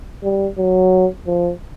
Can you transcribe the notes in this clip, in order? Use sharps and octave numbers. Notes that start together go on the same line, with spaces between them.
G3
F#3
F3